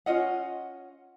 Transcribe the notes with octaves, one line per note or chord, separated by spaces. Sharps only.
C#4 F4 D#5 F#5